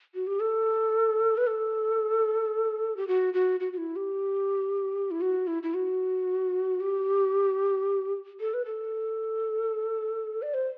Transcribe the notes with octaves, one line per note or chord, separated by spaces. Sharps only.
F#4
G4
A4
B4
A4
G4
F#4
F#4
F#4
F#4
E4
G4
E4
F#4
E4
E4
F#4
G4
A4
B4
A4
D5
C5